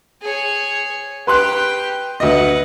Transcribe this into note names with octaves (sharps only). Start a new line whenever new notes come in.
G#4 C#5
G4 B4 G5 C6 F#6
D2 B4 D#5 F#5